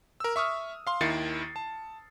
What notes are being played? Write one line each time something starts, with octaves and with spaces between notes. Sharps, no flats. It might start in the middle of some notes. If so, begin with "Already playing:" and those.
A#4 E6
E5 C#6 D#6 F6
F5 C6
D#2 D#3 E4 A6 C7 C#7
A5